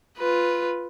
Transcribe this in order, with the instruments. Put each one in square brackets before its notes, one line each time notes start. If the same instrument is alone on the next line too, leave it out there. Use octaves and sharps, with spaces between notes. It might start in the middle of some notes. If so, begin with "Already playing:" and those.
[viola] F4 B4